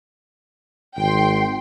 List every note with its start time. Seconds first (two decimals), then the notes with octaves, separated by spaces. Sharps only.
0.97 G#1 G5 C6